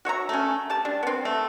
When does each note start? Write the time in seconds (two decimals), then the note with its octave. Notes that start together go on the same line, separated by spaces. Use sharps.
0.05 F#4 C#5 E5 A#5
0.29 A3 C#4
0.70 G4 A5
0.85 G3 D4
1.03 B3 C4
1.25 A3